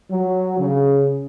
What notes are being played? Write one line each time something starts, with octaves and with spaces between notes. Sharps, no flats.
F#3
C#3